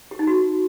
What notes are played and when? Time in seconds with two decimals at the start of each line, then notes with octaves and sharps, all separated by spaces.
0.11 G4
0.19 D#4
0.27 F#4